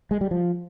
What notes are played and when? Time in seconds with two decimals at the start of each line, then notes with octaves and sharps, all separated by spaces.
0.11 G#3
0.21 G3
0.31 F3